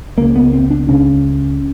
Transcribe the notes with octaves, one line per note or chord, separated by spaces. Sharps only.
C#2 C#3 A#3
B3
C4
D4
C#2 C#3 C#4